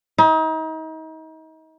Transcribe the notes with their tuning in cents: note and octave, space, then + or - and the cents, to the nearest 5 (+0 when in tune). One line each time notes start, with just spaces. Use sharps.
D#4 +35